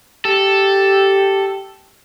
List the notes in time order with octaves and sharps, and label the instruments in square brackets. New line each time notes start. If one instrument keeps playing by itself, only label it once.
[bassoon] G4 [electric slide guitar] A4